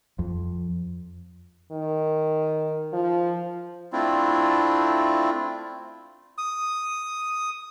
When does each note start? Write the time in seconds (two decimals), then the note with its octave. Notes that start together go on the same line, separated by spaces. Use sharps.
0.19 F2
1.72 D#3
2.93 F3
3.93 A3 C4 D4 E4 F4
6.38 D#6